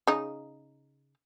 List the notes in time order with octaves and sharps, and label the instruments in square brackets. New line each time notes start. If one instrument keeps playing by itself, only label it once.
[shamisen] C#3 D#4